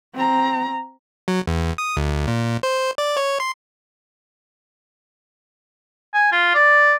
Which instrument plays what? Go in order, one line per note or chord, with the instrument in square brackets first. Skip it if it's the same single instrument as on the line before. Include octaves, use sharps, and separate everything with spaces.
[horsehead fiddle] C4 A#5
[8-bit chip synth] F#3
E2
D#6
D2
A#2
C5
D5
C#5
C6
[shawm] G#5
F4
D5